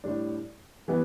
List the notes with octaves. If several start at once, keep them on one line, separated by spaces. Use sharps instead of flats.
A2 G3 D4
E3 G3 B3